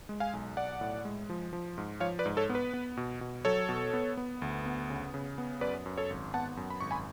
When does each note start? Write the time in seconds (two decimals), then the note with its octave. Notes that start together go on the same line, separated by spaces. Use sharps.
0.09 G#3
0.20 F5 G#5
0.33 B1
0.57 B1 D5 F#5
0.81 A2
1.05 G#3
1.30 F3
1.53 F3
1.78 G#2
2.00 F3 C#5 F5
2.19 B4 D5
2.26 G#2
2.37 A4 C#5
2.50 B3
2.55 B4
2.74 B3
2.97 B2
3.21 B2
3.45 F#3 A4 C#5
3.69 B2
3.94 B3
4.17 B3
4.42 D2
4.66 B3
4.90 C#3
5.14 C#3
5.38 B3
5.61 F#2 B4 D5
5.86 F#2
5.97 A4 C#5
6.10 G#1
6.34 B3 F#5 A5
6.57 F#2
6.70 B5
6.81 G#1 C#6
6.91 G#5 B5